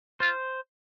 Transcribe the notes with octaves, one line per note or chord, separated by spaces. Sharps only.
F4 C5